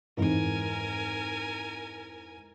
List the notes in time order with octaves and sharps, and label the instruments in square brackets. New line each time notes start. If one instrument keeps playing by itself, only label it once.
[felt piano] F2 G#2 E3 [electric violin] A#4 G#5